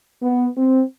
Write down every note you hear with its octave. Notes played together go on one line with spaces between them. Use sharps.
B3
C4